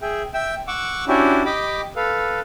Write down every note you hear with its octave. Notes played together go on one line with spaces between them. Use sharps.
G#4 E5 G5
E5 G5 E6
F#5 C#6 D6 E6
C#4 D4 E4 F#4 G4
G4 D#5 B5 D6
A4 B4 F5